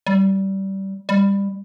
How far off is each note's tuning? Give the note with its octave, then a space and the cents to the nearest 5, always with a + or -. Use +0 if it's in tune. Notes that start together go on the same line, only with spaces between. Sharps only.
G3 -20
G3 +20